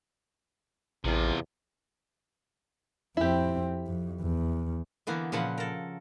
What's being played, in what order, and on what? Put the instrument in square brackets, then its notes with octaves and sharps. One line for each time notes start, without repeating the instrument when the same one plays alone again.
[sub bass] A1 [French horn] E2 [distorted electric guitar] C3 F4
[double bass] F2 C4 [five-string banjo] E4 G4
[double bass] F2
E2
[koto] D3 E3 A#3 B3
A#2 C#3 F3 B4 F#5
A4 A#4